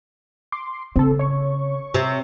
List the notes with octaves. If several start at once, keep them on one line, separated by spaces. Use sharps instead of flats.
C6 D6
C#3 C4 A4
C#5 C#6
C3